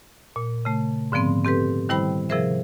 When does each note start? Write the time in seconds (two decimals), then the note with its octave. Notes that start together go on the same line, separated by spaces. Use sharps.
0.36 A#2
0.65 C#3 A3
1.12 G#2 D3 F3 B3 C4
1.45 C4 G4 A4 B4
1.89 D#3 G3 E4 C5 G5 B5
2.29 C3 F3 G#4 A#4 C5 E5